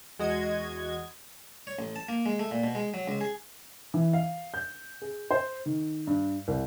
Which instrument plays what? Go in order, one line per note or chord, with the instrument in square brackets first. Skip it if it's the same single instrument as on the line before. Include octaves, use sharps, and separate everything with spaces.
[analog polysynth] E2 G#3 F#4 D#5 G#6
[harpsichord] C#5
A1
A5
A#3
G#3
A3
A#2
B2
G#3
F#3
C#2
G#4
[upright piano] E3
F5
G6
G#4
C5
D#3
G2
C2